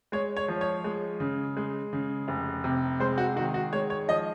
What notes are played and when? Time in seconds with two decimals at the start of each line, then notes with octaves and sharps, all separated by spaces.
0.12 G#3 C#5
0.37 C#5
0.48 F3
0.61 C#5
0.84 G#3
1.20 C#3
1.57 G#3
1.93 C#3
2.28 F1
2.64 C3
3.00 G#3 C5
3.18 F#4
3.36 D#3 F#4
3.54 F#4
3.72 G#3 C#5
3.90 C#5
4.08 F3 D#5